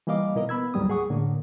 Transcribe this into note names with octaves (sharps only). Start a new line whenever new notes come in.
E3 G3 A#3 D#5 F5 D6
B2 E4 A#4 D#5
B3 B5 E6 G#6
D2 G#2 F#3 G3 A#3 D#6
G#4 F#5 C#6 D#6
A2 D3 A#3